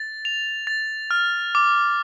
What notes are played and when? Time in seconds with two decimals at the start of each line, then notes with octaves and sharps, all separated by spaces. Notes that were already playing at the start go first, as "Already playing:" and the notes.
Already playing: A6
0.25 F7
0.67 A6
1.11 F6
1.55 D6